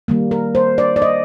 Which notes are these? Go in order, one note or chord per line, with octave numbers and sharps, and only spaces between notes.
D#3 G3 A#3
A#4
C5
D5
D5
D#5